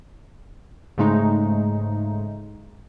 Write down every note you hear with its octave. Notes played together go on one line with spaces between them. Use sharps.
G#2 C#3 G#3 A3 D#4